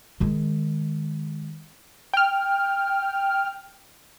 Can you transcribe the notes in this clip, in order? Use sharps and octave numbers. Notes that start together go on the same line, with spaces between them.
D#3 G#3
G5 F6